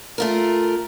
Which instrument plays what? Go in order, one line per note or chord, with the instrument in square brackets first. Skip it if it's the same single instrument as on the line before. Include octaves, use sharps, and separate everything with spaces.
[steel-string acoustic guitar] A3 F4 A#4